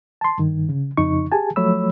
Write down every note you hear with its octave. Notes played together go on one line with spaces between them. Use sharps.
A5 C6
G2 D#3
C#3
F2 C#3 D#4 C#6
G4 G#4 G#5 A5
F3 F#3 A3 C#5 B5 E6